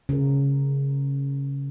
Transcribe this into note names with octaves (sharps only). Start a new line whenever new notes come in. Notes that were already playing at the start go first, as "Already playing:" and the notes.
C#3 A#4